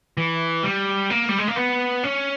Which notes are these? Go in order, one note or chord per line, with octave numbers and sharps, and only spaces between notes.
E3
G3
A#3
G3
G#3
A#3
B3
C#4